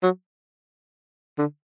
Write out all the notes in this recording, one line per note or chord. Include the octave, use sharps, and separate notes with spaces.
F#3
D3